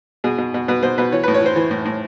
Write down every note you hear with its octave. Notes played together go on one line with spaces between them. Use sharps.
B2 G#4
B2
B2
B2 B4
B2 C5
B2 B4
E3 C#5
A2 B4
C#5
E3 C5
E3
A2
A2